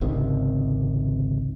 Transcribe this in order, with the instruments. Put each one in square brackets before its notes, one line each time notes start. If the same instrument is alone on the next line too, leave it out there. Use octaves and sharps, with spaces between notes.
[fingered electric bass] G#1 C#2 C3 D#3